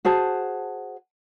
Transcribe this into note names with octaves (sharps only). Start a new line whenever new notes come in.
F#4 G#4 C5 A5